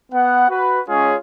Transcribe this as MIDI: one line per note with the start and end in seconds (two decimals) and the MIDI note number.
0.12 0.49 59
0.12 0.49 78
0.50 0.80 66
0.50 0.80 71
0.87 1.15 56
0.87 1.15 61
0.87 1.15 65
0.87 1.15 68
0.87 1.15 73